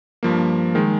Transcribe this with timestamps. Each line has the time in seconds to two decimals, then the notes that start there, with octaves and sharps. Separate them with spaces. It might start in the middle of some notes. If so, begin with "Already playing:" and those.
0.23 G2 F3 A#3
0.75 D#3 G#3